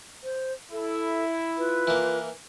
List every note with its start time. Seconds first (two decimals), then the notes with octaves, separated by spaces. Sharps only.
0.23 C5
0.72 E4 A4
1.58 F4 B4
1.87 E3 A#3